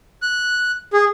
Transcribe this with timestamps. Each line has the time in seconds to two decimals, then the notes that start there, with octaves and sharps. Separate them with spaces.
0.22 F#6
0.93 G#4